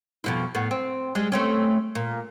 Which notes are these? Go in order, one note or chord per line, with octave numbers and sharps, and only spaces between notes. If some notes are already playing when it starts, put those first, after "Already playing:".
F2 B2 E4
A2 B3
C4
G3 G#3
A3 C4 C#4
A#2